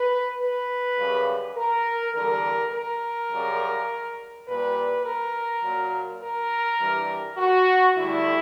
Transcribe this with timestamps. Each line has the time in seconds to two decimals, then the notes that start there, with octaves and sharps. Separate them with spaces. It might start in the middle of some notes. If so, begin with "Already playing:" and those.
Already playing: B4
0.40 B4
0.98 F#2 C#3 G3
1.57 A#4
2.14 E2 D3 G3 A#4
2.72 A#4
3.30 F#2 C#3 G3
4.47 A#2 G3 B4
5.05 A#4
5.63 A#2 F#3
6.22 A#4
6.80 G2 E3 G3
7.38 F#4
7.95 D2 D3 G3 E4